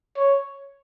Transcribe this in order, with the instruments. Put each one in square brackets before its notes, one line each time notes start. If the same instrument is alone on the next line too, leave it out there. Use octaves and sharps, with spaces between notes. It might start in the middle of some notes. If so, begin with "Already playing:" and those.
[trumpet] C#5